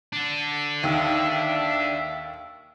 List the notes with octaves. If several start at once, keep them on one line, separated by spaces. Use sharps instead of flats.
D4 A4
D#2 E5